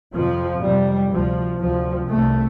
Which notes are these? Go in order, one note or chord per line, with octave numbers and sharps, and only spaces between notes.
F2 C3 F3
F2 C3 G3
D2 C3 F3
D2 C3 F3
C2 C3 A3